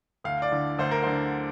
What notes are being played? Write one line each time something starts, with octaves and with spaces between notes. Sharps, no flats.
D2 F5
D5
D3
D2 C5
A#4
D3 C5